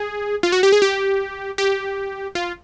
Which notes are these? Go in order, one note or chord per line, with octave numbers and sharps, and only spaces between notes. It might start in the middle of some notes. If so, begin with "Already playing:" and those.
Already playing: G#4
F4
F#4
G4
G#4
G4
G4
F4